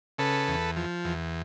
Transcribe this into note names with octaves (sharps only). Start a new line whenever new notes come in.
C#3 A4 B4
E2
F3
E2